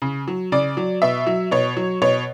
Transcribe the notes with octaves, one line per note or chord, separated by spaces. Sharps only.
C#3
F#3
C#3 D5
F#3
B2 E5
F#3
B2 C#5
F#3
B2 C#5